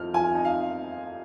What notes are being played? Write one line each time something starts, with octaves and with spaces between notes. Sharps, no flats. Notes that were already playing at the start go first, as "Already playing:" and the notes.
Already playing: F2 C4 D#4 F6
F3 G#5
D#4
F5